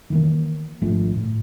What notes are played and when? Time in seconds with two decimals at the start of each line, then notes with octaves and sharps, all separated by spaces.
0.10 D#3 E3 A#3
0.82 G#1 F3 A3 D4
1.16 A2